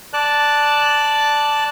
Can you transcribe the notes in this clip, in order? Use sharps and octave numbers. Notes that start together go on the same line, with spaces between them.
D5 A5 F#6